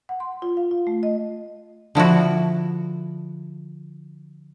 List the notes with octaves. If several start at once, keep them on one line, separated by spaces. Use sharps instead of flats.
F#5
C6
F4
F5
F4
A3
D#5
D3 F3 E4 F#4